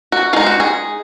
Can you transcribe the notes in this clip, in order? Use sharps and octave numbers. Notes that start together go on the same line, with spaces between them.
F#4
G#3 D#4 F4
F#4
G#4